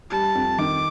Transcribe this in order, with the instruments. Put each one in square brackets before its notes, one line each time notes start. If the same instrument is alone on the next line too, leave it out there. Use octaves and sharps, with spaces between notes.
[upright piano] G3 [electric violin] A5
[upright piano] F2
[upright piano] D#3 [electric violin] D6